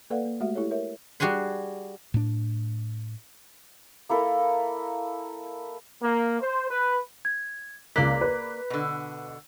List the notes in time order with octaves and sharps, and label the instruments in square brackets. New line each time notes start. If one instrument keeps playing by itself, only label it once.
[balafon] A#3 A4 B4 D5 F5 F#5
A#3
G#3 A3 F#4 G4 E5
E4 G4 A4 C#5
A#4 C#5 E5
[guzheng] G3 F#4 G#4 G#5 C6
[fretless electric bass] A2 D4
[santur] A#3 E4 A4 A#4
[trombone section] A#3
C5
B4
[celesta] G#6
[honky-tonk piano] C#2 F#6 [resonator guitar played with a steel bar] A#3 D5 [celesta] B6
[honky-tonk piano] B4
[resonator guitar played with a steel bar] B2 D3